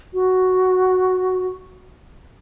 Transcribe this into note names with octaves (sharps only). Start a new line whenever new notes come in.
F#4